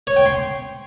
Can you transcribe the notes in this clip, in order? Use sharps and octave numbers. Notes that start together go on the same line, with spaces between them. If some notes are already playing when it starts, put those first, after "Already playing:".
C#5
G5
C6